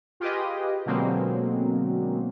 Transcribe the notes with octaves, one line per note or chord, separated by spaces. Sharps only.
F4 G4 G#4 B4 D#5
B2 D3 F#3 G#3 A#3 C4